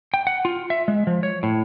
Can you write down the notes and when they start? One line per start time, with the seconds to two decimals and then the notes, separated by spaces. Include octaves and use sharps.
0.14 G5
0.27 F#5
0.45 F4
0.70 E5
0.88 G#3
1.07 F3
1.23 C#5
1.43 A2